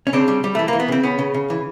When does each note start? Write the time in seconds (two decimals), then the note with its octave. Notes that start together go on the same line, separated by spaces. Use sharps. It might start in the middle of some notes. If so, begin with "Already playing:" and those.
0.07 C#4
0.13 C#3 C4 D4
0.28 G3
0.44 G3
0.55 E3 A3
0.68 A#3
0.73 E3
0.80 B3
0.88 C#3 C4
1.03 C#3 B3 C#4
1.19 C#3
1.34 C#3
1.50 E3